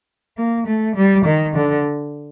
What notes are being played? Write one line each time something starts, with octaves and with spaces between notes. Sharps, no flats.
A#3
A3
G3
D#3
D3